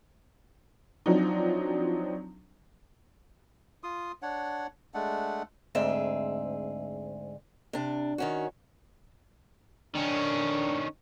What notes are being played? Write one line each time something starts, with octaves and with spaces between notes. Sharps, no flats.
F3 F#3 C4 D4 D#4
F4 C6 D#6
D4 C#5 F#5
G#3 A3 D4 F#5
D2 G#2 C4 G#4 E5
C3 D4
D#3 C#4 F#4
D#3 C#4 D4